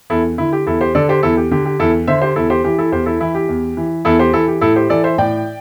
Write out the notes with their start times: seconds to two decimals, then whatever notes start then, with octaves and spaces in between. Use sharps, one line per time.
0.10 E2 E4 A4
0.38 D3 E4
0.53 G4
0.66 E2 E4 A4
0.81 G4 C5
0.95 D3 A4 D5
1.09 G4 C5
1.23 E2 E4 A4
1.37 G4
1.51 D3 G4
1.66 G4
1.79 E2 E4 A4
2.08 D3 C5 E5
2.22 G4 C5
2.36 E2 E4 A4
2.50 G4 C5
2.64 E3 G4
2.78 E4 A4
2.92 E2 G4 C5
3.06 E4 A4
3.21 E3 E4
3.35 G4
3.49 E2
3.77 E3
4.05 E2 E4 A4
4.19 G4 C5
4.33 E3 E4 A4
4.48 G4
4.61 A2 E4 A4
4.76 G4 C5
4.89 E3 A4 D5
5.04 C5 E5
5.18 A2 D5 G5